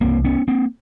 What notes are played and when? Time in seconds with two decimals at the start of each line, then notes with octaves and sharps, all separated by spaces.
0.01 C2 C3 A#3 C4
0.25 B3 C#4
0.48 A#3 C4